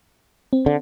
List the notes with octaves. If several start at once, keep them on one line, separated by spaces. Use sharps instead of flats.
C4
D3